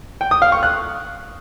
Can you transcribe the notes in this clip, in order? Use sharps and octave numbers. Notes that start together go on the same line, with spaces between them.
G5
D#6
F5
C#6
F#6